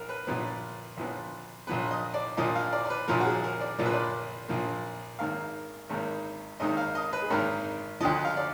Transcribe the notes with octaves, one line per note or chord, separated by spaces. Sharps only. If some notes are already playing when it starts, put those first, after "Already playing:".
Already playing: A#1 A#4
B4
A#1 A#2 F3 B3
A#1 A#2 F3 B3
A#1 A#2 F3 B3 B4
D#5
D5
A#1 A#2 F3 A#3 D#5
F5
D5
D5
B4
A#1 A#2 F3 A#3 A#4
F#4
G#4
A#4
D5
A#1 A#2 F3 A#3 D5
B4
D5
A#1 A#2 F3 A#3
G#1 G#2 D#3 A#3 F5
G#1 G#2 D#3 A#3
G#1 G#2 D#3 A#3 D#5
F5
D#5
B4
G#4
G#1 G#2 D#3 A#3 A#4
D2 D3 F3 D#5
F5
D5